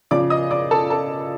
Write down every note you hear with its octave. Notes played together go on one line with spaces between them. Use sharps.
C#3 F3 D5 D6
D#5 D#6
D5 D6
A4 A5
A4 A5